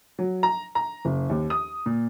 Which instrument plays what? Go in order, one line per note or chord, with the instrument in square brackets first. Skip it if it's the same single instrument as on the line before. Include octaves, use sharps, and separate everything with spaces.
[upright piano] F#3
A#5
A#5
F#1
D#2
D#6
A#2